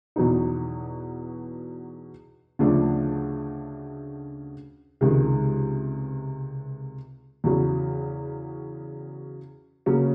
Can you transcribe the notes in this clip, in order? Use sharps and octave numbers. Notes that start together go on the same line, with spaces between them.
E2 B2 F#3 B3 D#4
D2 C#3 F3 A3 D4
C#2 C3 D#3 G#3
E2 C#3 F#3
C#3 F#3 A#3 C#4